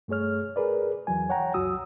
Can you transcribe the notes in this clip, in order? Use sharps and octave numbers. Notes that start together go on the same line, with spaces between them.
G2 A3 G#4 C#5 F6
G#4 A#4 B4 D5
E2 E3 F#3 G#5
C#5 F#5 G5 A#5
C#2 F#2 F#3 F#4 D#6 E6